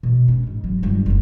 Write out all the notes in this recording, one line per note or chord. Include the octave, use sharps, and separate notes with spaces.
B2
C#4
G#2
F#3
G1 G3
F#1 D#2